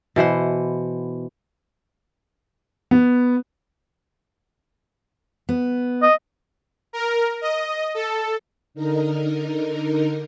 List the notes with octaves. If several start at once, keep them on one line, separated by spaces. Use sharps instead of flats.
B2 E3 C5 F#5
B3
B3
D#5
A#4
D#5
A4
D3 D#4 A#4